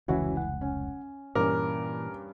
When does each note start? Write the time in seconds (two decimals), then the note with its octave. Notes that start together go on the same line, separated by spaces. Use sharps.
0.08 F1 C#2 E3 C#4 E4 F#4
0.37 F#5
0.61 C#4
1.35 G2 A#2 E3 C#4 A#4 D6